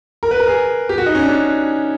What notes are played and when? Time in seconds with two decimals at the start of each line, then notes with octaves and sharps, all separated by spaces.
0.23 A#4
0.31 B4
0.40 A#4
0.48 G#4
0.89 G4
0.98 F#4
1.06 D#4
1.15 C#4
1.23 D4